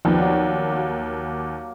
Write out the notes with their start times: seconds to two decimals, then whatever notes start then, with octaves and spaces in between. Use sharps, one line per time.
0.05 D#2 F3 G3 B3
0.20 F#3 A#3
0.72 A#3 F#4